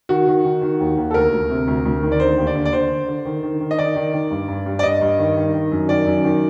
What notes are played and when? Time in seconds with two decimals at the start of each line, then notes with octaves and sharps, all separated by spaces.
0.09 D#3 F#4
0.27 D#3
0.44 D#3
0.62 D#3
0.80 D#2
0.97 D#2
1.11 A4
1.14 D2 A#4
1.32 D2
1.50 C3
1.68 D2
1.85 D2
2.03 D#3
2.12 D5
2.20 D3 C5
2.38 D#2
2.47 D5
2.55 D3
2.65 D5
2.73 D3 C5
2.90 D3
3.08 D3
3.25 D#3
3.43 D#3
3.60 D#3
3.71 D#5
3.78 D#3 D5
3.96 D#3
4.13 D#3
4.31 G2
4.48 G2
4.66 G2
4.79 D5
4.83 G2 D#5
5.01 G2
5.19 D#3
5.37 D#3
5.54 D#3
5.71 F#2
5.89 D#3 D5
6.07 F#2
6.24 D#3